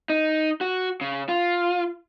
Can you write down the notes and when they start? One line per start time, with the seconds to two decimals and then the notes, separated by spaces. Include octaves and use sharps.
0.10 D#4
0.61 F#4
1.01 C#3
1.29 F4